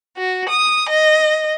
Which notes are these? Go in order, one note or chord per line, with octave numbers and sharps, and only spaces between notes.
F#4
D#6
D#5